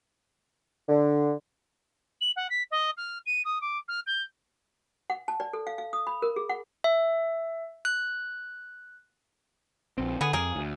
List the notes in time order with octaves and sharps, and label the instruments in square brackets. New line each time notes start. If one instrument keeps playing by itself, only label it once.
[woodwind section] D3
[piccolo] F#7
F#5
B6
D#5
F6
D#7
D#6
D6
F6
G6
[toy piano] F#5
A5
D5
A4
F5
F5
D#6
B5
A#4
G#4
F#5
[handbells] E5
F#6
[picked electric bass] A#1 C4
[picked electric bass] D3 [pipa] B3 G#4
[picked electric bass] F2 [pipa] A#3 G#4
[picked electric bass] D2